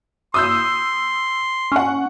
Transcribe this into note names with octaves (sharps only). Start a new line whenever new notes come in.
C6 D#6 E6 G6
C#4 F#5 C#6